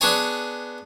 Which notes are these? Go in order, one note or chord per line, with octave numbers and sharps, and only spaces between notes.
B3 D4 G#4 C#5 G#5